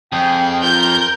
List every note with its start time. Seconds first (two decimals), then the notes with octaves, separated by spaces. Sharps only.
0.13 F2 G#4 G5
0.63 F4 A#4 G6